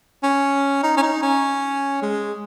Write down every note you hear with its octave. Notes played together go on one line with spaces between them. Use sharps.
C#4
D#4
C#4
D#4
C#4
G#3